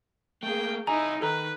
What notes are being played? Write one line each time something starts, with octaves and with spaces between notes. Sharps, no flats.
A3 A#3 G#4 G5
C2 D#4 E4 D#5 G#5 A#5
D#3 A4 B4 A#5